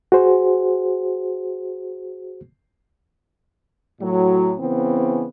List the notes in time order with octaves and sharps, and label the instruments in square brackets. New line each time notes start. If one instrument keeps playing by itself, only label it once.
[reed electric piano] F#4 G#4 C5
[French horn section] A2 F#3
C#3 E3 B3 C4